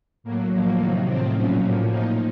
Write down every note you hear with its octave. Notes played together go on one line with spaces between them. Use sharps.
A2 F#3 A#3
A2 F3 A#3
C3 D#3 F#3
A2 F3 C4
A#2 F#3 C#4
A2 F3 A#3
A#2 F3 D#4